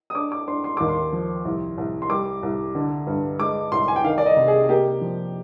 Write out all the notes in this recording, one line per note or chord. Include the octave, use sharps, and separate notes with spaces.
D#6
D4 D6
D6
D4 C6
C6
D#2 D6
C6
F3
C2
C2
C6
G3 D6
C2
D3
G2
G#3 D6
C2 C6
G#5
G5
D#3 F5
D5
D#5
C3
G#4
A#3 G4
F3